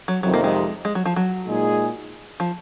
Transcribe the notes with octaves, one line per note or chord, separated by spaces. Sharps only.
F#3
F2 C3 D#3 F#3
A#3
G#3
G#3
F#3
F3
F#3
A#2 G#3 D#4 G#4
F3